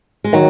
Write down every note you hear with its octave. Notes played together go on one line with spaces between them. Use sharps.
G#3
D#3 F#3